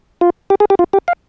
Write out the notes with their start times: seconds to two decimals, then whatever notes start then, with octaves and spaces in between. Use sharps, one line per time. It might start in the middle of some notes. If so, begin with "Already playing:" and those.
0.21 F4
0.50 G4
0.60 G#4
0.70 G4
0.79 F4
0.93 G4
1.08 F5